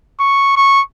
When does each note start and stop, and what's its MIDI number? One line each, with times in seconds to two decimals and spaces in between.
0.19 0.53 85
0.57 0.81 85